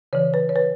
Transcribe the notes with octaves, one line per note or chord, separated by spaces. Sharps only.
C#3 E3 C#5
B4
C#5
B4